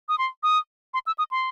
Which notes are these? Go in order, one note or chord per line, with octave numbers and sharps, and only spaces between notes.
D#6
C6
D#6
C6
E6
D#6
C6